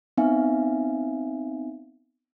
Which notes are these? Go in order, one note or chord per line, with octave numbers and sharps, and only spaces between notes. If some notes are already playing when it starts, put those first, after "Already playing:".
B3 C4 D#4 E5 F5 G#5